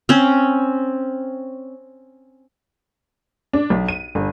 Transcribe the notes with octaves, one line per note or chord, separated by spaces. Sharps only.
C4 C#4
D4
B1
D#7
G1